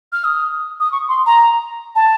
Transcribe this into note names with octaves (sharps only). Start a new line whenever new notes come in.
F6
D#6
D#6
C#6
C6
A#5
A5